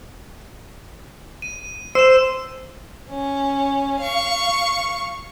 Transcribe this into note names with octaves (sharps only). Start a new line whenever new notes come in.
D#7
C5 E6 E7
C#4
F5 C#6